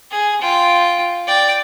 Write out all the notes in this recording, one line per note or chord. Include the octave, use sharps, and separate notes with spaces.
G#4
F4 G5
D5 G5